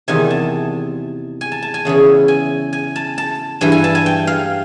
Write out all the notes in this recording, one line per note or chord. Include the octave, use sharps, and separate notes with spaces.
E2 C3 D#3 G#5
A5
G#5
A5
A5
G#5
E2 C#3 E3
G#5
G#5
A5
A5
G2 E3 G#5
G#5
A5
G#5
G5
F5